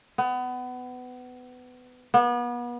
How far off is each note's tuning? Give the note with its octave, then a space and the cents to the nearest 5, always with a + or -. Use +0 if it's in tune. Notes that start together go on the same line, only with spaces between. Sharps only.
B3 +25
B3 -35